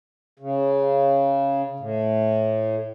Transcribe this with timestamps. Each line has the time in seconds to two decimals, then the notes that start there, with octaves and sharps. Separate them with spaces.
0.39 C#3
1.80 A2